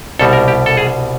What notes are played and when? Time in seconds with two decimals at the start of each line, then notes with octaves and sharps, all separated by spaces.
0.19 C2 B2 G3 A4
0.33 A#4
0.48 G4
0.66 A4
0.77 G#4